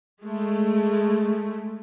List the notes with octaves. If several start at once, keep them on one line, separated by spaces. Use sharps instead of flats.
G#3 A3